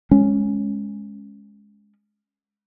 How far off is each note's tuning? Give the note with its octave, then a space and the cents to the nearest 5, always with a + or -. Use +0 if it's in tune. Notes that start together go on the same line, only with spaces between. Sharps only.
G#3 +0 C#4 +0